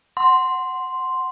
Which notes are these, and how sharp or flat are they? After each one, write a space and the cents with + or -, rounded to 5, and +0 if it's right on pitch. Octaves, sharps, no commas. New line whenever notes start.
F#5 +0 C6 +0